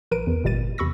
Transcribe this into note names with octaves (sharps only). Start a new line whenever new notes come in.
A#1 A#4 B4 D7 D#7
E2
G1 A#2 G3 A6 D#7
E2 C3 B5 C#6 E6 A#6